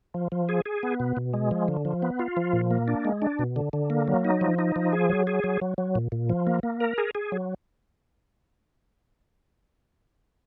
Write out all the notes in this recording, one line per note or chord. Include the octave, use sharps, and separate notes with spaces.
F3
F3
G#4
G#4
B3
B2
B2
G#3
F3
D3
F3
B3
F4
F3
A#2
A#3
D4
G#3
D4
B2
D3
D3
A#3
F#3
D#4
F3
D#4
F3
G#4
F#3
G#4
F#3
F#3
F#3
A#2
A#2
F3
A#3
A#3
A#4
G#4
G#4
F#3